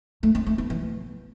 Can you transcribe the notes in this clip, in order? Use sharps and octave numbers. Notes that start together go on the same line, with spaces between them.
A3
C4
A3
B3
E3